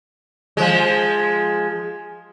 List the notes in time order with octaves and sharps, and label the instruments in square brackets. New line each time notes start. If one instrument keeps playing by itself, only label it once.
[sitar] F3 G#3